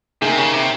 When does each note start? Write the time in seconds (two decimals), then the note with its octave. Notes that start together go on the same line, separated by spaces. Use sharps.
0.21 C3 A#3 D#4 G#4
0.38 C#3
0.53 C3